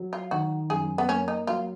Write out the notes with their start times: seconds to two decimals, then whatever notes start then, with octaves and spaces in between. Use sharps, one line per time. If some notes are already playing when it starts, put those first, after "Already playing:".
Already playing: F#3
0.13 F4
0.31 D#3 F#4
0.70 F#2 G#4
0.98 B3
1.09 A#3 C#4
1.28 D#4
1.47 F#3 F4